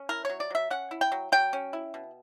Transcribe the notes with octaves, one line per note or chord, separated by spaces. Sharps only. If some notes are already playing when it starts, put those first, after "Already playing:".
Already playing: C#4
E4 A#4
F#3 C#5
D5
F#3 E5
C#4 F#5
E4
G5
F#3
F#3 G5
C#4
E4
B2